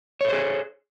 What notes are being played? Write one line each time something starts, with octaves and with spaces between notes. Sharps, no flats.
G#4 A4 C5 C#5